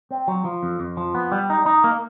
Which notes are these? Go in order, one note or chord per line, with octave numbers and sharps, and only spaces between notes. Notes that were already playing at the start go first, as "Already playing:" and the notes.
C4
F#3
F3
F2
F2
F3
B3
G3
D#4
D#4
A#3